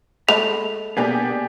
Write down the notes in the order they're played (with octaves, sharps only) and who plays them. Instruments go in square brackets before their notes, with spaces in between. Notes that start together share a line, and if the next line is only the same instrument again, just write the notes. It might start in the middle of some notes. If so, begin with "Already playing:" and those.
[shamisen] G#3 A3 [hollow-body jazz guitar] B5 C6 [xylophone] F7
[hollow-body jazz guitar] B2 A#3 B3 [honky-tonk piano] D4 G4 G#4